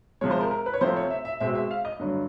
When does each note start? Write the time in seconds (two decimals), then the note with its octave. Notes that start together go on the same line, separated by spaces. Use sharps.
0.21 C3 F3 G#3 C#5
0.31 C5
0.41 A#4
0.51 A#4
0.66 B4
0.74 C#5
0.81 C3 F3 A3 C4 C5
0.96 C#5
1.10 E5
1.25 E5
1.40 B2 G#3 C4 E5
1.55 E5
1.71 F5
1.85 D#5
1.99 G2 D3 F#3